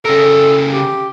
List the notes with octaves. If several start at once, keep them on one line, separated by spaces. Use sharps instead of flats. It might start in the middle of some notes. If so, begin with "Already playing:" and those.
C#3 A4 A#4
G4